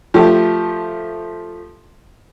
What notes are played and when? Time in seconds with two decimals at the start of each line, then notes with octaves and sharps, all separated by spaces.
0.14 F3 A3 G4